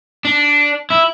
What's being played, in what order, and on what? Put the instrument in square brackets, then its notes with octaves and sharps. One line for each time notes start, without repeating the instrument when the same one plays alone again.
[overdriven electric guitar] D4
E4